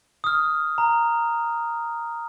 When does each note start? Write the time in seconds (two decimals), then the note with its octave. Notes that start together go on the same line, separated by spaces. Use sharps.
0.24 D#6 F6
0.78 A#5